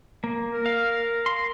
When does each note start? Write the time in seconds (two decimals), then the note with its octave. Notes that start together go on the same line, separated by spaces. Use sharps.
0.24 A#3
0.53 A#4
0.66 F5
1.26 C6